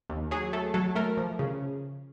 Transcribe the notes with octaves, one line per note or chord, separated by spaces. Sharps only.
D#2
F#3 G#4
A3 A4
F#3 A4
A3 A#4
F3
C#3